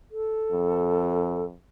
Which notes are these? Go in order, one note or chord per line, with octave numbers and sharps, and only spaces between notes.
A4
F2